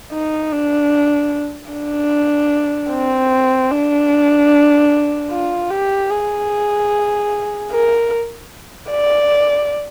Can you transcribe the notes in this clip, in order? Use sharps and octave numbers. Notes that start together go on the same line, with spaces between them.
D#4
D4
D4
C4
D4
F4
G4
G#4
A#4
D5